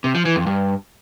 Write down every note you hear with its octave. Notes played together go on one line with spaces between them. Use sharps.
C3
F3
E3
F2
G2